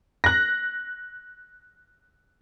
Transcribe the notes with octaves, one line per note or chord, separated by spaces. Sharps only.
F#6 A#6